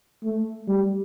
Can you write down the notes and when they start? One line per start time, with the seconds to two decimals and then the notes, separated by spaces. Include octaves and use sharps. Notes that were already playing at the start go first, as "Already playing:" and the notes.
0.24 A3
0.67 G3